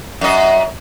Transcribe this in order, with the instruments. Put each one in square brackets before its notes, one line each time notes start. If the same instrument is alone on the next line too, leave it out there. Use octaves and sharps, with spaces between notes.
[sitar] F#2 D#5